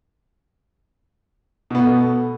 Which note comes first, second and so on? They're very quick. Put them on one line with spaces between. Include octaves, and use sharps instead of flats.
B2 B3 A3